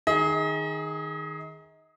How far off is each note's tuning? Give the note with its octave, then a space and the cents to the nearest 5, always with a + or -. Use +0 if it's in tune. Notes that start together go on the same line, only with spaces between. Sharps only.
D#3 +0 G#4 +0 D#5 +35